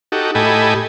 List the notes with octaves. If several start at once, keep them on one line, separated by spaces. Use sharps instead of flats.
D#4 F#4 G4 A4
A2 G4 A4 D#5 G#5 B5